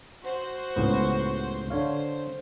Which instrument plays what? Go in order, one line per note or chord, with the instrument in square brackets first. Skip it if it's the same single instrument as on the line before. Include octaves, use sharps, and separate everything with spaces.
[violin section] F#4 C5
[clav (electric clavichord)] C#2 A2 B3
[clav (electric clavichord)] D3 C#5 F5 [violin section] C5